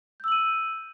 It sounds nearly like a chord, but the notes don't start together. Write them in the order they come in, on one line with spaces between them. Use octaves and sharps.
G6 E6 F#7 D#7